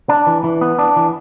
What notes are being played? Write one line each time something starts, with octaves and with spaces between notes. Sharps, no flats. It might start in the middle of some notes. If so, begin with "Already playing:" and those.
D4
E3
E3
B3
D4
E3